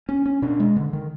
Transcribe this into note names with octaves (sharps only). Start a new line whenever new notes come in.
C#4
C#4
B2 D4
G#3
D3
D#3